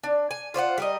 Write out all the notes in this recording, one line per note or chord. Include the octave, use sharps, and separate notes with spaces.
D4
G#5
F4 C5 C#5 F#5
G3 A#4 D#5